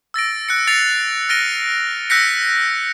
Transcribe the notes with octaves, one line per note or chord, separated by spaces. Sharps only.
E6 A6 A#6 D7
F#6 C#7
A6 A#6 C7 C#7 F7
F6 A6 A#6 D7 D#7 G7
E6 F#6 G6 A#6 B6 C#7